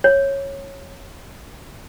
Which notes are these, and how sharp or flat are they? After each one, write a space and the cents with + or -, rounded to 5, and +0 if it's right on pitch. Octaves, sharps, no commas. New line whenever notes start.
C#5 -10